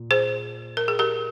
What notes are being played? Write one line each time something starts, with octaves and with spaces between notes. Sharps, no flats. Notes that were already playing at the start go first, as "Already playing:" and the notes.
Already playing: A#2
G#4 C5
A#4
G#4
G4 A#4